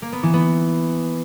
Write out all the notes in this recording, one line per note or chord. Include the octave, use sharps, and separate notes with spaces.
A#3
B3
E3
B3